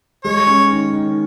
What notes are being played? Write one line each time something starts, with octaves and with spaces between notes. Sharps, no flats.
G#3 C#5
C#4
D#3
D#3